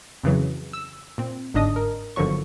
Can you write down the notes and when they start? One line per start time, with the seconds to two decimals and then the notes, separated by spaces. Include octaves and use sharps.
0.23 F2 C#3 E3 F#3
0.73 E6
1.18 A#2 C4
1.54 G1 G#2 D4 D#5 D#6
1.76 A#4
2.16 G1 D3 D#3 F3 F#3 C#6